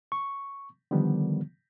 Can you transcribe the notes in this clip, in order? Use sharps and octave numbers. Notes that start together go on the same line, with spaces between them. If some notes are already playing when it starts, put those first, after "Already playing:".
C#6
D3 D#3 F3 G3 B3